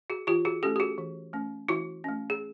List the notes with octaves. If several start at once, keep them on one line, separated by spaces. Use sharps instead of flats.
F#4 G#4
E3 F4 G4
F#4 G#4
A3 C#4 G4 A4
G4
F#4 G#4
E3
A3 C#4
E3 E4 F#4
A3 C#4
G#4